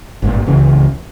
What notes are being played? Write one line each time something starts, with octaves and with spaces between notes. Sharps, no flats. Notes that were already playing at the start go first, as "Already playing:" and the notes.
G#1 G2 A#2
D1 C#2 C#3 E3